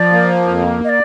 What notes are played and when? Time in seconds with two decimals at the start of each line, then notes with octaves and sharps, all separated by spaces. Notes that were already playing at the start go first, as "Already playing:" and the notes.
Already playing: F3 D5
0.12 A#3
0.48 F2
0.84 D#5
0.89 D5